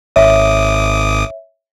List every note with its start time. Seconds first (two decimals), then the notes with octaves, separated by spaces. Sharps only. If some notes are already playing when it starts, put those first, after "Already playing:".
0.16 G#1 C#5 E5 D6 D#6